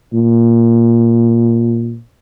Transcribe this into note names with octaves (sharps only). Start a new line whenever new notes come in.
A#2